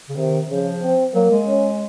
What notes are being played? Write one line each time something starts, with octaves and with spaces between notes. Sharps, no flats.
C#3
C3 D#3
C#3 F3
C4
F#3 A#3
G#3
C#4